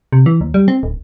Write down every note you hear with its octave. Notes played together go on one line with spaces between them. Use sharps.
C3
E3
D#2
G3
C4
D1